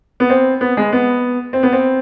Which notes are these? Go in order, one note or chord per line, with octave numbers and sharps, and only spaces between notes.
B3
C4
B3
G#3
B3
C4
B3
C4